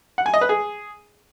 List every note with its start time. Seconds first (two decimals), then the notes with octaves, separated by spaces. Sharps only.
0.18 F#5
0.26 G#5
0.34 D#5
0.41 B4
0.49 G#4